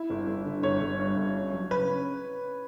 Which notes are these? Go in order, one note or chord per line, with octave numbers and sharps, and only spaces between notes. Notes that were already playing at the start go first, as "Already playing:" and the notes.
Already playing: E4
G1
G1
D3
G1 C#5
G1
G2
G1
C#4
F#3
C#3 B4
C#4